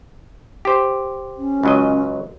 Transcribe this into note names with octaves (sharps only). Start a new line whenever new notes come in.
G4 C5
C#4
C#2 F#3 D#5